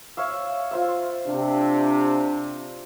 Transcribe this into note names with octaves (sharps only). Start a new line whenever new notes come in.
C#5 E5 F5
F4 C5 E5
C3 D4